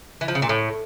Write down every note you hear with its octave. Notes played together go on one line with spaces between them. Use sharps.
E3
F3
C#3
A#2
A2